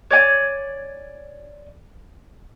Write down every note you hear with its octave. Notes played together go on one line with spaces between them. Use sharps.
C#5 D5 G#5